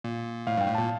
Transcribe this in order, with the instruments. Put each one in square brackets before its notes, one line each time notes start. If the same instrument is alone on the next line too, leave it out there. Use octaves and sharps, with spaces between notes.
[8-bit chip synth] A#2
[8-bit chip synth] A2 [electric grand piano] F5
[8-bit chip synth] G2 [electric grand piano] G5
[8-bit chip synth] A2
[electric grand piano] A5
[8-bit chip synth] A#2